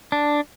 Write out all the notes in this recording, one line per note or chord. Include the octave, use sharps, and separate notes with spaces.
D4